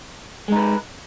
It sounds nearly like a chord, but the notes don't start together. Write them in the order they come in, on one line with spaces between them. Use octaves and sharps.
G#3 D#4 B4